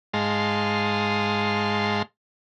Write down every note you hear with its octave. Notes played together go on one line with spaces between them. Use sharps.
G#2 G#3 D#5 F5 A5 C6